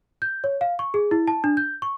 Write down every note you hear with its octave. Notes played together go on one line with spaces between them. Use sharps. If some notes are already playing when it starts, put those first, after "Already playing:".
G6
C#5
F5
C#6
G#4
E4
A5
D4
G6
C#6